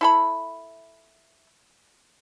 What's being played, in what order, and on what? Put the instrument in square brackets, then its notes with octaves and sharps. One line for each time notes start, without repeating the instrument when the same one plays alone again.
[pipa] E4 A4 B5